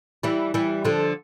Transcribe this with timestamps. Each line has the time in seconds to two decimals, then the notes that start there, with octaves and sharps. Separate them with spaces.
0.23 E3 G3
0.54 E3 G3
0.85 D3 F3